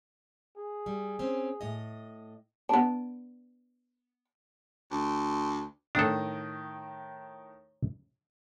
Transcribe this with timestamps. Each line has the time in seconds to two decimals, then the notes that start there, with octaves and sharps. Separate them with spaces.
0.57 G#4
0.86 G3
1.19 C4 C#4
1.61 A2 D#5
2.69 B3 D4
4.91 D2
5.95 A2 D#3 D4 A4 D#6